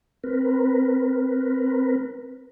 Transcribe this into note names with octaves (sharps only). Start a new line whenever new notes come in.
C4 A#4 B4